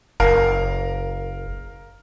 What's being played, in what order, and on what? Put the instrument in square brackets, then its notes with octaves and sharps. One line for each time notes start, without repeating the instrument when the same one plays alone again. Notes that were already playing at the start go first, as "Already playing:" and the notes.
[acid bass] F#1 [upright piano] A#4 F5